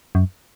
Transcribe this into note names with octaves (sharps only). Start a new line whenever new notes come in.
F#2